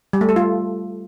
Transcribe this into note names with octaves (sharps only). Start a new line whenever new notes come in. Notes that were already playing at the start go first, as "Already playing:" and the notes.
G3
A3
A4
F4